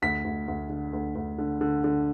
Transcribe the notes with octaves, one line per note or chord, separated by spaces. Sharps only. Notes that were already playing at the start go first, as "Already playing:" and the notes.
D2 B6
D2
D2
D3
D2
D2
D3
D3
D3